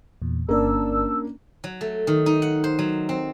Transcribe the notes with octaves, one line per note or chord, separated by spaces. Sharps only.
E2 A#2
G1 A#3 C#4 D4 A#4 D5 A5 E6
F#3
A3
D#3
D#4
F#5
C5
F#3
C4